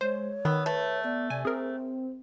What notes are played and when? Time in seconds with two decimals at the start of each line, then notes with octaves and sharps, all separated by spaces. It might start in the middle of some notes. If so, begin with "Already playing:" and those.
0.01 G#3 C5 C#5
0.45 D#3 B3 E6
0.66 A3 B4
1.04 B3 D5
1.30 C3 D5 G#5
1.45 C4 G#4 A#4 C5